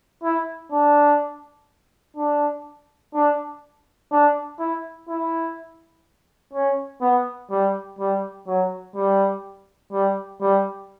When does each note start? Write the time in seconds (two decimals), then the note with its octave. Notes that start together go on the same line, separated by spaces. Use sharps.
0.23 E4
0.72 D4
2.17 D4
3.14 D4
4.11 D4
4.59 E4
5.08 E4
6.53 C#4
7.01 B3
7.50 G3
7.99 G3
8.47 F#3
8.95 G3
9.92 G3
10.41 G3